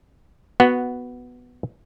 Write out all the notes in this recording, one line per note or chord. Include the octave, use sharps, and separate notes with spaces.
B3 F#4 F#5